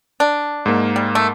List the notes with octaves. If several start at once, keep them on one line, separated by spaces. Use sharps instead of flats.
D4
G#2 A#3
G3
A3